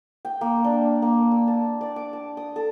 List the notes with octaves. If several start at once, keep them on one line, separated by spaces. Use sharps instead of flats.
G5
A#3
D4
A#3
E6
A5
D5
D6
A5
D#6
A4